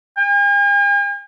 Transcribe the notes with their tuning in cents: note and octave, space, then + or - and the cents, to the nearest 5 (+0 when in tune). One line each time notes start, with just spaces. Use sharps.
G#5 -45